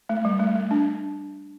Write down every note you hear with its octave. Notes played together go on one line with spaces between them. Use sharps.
A3
G3
A3
A3
D4